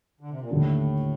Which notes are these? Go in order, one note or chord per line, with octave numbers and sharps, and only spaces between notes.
D3
C3
A#2
D#2 A2 D3 G3 D4